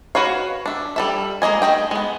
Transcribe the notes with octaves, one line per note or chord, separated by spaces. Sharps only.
F#4 B4 C#5 F5
D4 E5
G3 A4 E5
G#3 A#3 D#5 G#5
A3 G#4 D#5 G5
G#3 B3